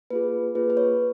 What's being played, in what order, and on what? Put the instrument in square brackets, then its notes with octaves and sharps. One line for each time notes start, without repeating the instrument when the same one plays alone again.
[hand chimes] A#3 F4 G#4 B4
A#3 F4 G#4 B4
B4
C#5